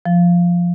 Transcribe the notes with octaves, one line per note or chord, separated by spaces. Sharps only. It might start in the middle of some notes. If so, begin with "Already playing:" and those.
F3